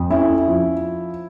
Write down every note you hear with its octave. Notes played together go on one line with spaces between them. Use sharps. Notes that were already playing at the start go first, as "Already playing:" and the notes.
Already playing: F2
C#4 E4
F3